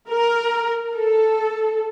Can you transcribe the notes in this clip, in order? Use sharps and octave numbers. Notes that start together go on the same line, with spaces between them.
A#4
A4